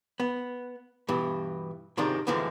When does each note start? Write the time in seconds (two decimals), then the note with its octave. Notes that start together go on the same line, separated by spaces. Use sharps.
0.20 B3
1.08 G2 B2 E3
1.97 G#2 C3 D#3 F3 G#3 D4
2.27 F#2 A2 D3 E3 F3 G#3